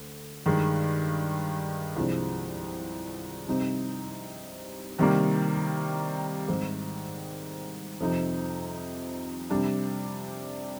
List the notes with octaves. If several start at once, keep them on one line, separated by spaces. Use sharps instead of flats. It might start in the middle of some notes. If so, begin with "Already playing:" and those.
Already playing: D2 D3
G2 D#3 G#3
C2 C3 F3 G#3 D4
C3 G3 C4 D#4
C3 D#3 G3 A#3
G#2 D#3 G3 C4
F2 C3 F3 C4 D#4
C3 G3 D4